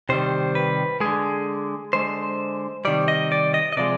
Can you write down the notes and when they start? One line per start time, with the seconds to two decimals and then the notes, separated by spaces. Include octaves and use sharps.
0.09 C3 D#3 G3 C5
0.55 B4
1.00 D3 G#3 G#4
1.93 D3 G#3 C5
2.85 C3 D#3 G3 D5
3.08 D#5
3.32 D5
3.54 D#5
3.73 D#5
3.77 C3 F3 G#3 D5